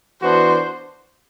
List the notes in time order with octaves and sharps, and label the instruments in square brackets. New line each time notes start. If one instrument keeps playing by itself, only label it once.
[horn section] E3 B3 D4 F#4 [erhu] C5